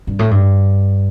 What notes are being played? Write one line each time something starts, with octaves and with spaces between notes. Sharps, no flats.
G2
A2
G2